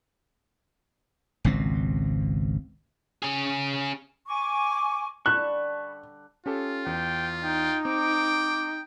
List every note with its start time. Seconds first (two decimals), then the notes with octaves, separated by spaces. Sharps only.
1.44 G#1 C#2 B2 C4
3.23 C#4 G#4
4.27 G#5 C#6 D6
5.26 D3 G3 A5 B5 C#6 D6 F#6
6.46 C#4 F4 G4 A4
6.86 E2 G5
7.44 D#4 G5
7.85 C4 G5 D6